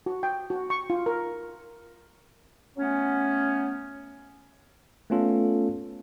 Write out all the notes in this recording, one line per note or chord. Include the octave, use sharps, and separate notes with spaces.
F#4
G5
F#4
C#6
F4
A#4
F#3 A3 B3 C#4
A3 B3 C#4 F4 A4